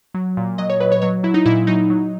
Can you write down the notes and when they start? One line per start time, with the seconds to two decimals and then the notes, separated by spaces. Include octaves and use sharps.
0.14 F#3
0.37 A#2
0.58 F#3 D#5
0.70 C#5
0.80 F#3 B4
0.92 C#5
1.02 F#3 C#5
1.23 F#3 E4
1.34 D#4
1.46 A#2 E4
1.67 F#3 D#4
1.90 F#3